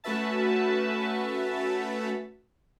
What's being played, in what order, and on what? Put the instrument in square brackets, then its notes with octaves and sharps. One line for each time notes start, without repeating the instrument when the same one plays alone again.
[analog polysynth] A3 C#4 F#4 B4 E5 A5